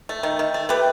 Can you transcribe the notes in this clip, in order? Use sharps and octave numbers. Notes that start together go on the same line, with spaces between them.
A3
D#3
D#3
A3
A3 G4 B4